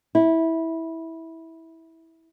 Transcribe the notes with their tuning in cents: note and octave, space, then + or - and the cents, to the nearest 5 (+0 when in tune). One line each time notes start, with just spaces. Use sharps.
E4 -15